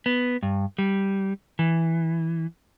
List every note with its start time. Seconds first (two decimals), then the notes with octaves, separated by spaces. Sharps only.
0.06 B3
0.43 G2
0.78 G3
1.59 E3